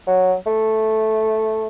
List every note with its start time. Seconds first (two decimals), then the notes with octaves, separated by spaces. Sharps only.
0.07 F#3
0.46 A3